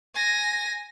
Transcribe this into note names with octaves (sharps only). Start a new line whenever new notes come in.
G#5 A#6